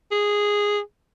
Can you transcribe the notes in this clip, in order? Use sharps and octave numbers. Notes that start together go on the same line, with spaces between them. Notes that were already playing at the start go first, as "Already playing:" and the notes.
G#4